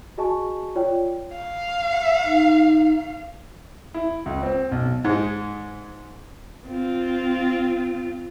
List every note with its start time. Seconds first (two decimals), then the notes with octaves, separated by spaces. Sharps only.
0.18 F#4 G#4 D#5 G#5 A5 C#6
0.75 F4 C#5 D5 G5
1.37 F5
2.24 D#4
3.94 E4
4.26 C#2
4.43 C4
4.71 B1
5.04 G#2 G#3
6.67 C4 F4